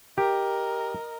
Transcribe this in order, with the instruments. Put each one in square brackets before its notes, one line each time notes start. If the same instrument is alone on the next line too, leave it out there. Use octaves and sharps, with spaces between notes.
[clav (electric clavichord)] G4 [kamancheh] A#4 D#5